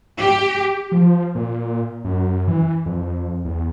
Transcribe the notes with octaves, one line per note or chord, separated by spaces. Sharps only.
G4
F3
F3
A#2
F#2
E3
F2
E2